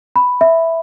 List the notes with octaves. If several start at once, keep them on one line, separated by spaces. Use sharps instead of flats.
B5
E5